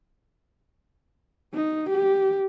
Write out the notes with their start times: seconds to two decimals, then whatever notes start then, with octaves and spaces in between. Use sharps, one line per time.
1.54 D#4
1.89 G4